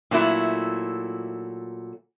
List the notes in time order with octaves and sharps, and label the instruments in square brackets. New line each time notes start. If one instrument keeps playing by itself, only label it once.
[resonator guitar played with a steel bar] A#2 F#3 A3 E4